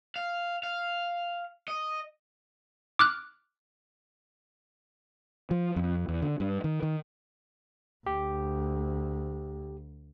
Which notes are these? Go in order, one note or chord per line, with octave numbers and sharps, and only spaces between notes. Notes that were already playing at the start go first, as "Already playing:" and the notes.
F5
F5
D#5
D6 F6 F#6
F3
F2
E2
D3
G2
D#3
D#3
D2 G4